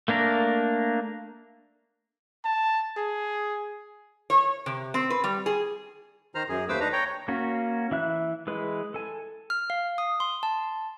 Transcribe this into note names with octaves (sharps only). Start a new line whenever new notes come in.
A3 A#3 D4 A#4
A5
G#4
C#5
C3
C4
B4
G3
G#4
D#3 C5 A#5 F6
F#2 G#4
D#2 A3 B4 C5 D6 E6
D4 D#4 B4 A#5
C#5 G5 A#5
A#3 C#4 F#4
E3 E5 F#6
E3 G#3 B4
A4 G#5
F6
F5
D#6
C6
A5